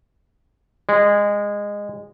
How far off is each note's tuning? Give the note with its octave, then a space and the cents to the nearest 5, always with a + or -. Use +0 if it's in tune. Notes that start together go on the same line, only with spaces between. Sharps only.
G#3 -20